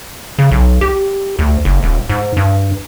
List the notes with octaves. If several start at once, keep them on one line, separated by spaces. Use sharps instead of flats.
C#3
B1
G4
D2
F#1
D#1
G#2
G2